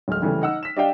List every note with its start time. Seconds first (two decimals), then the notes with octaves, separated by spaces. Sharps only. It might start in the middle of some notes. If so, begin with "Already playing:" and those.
0.08 D1 G#3 F6
0.22 C#3 E3 G3 A3
0.42 D#4 F#5 E6
0.63 B6 E7
0.77 D4 G4 D5 D#5 F5 G5